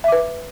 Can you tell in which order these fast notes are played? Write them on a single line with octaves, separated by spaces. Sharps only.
E5 D6 B4